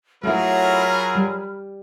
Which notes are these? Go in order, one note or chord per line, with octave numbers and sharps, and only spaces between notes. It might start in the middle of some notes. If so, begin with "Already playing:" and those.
F#3 A3 E4 F4 G#4 A#4 B5 F6
G3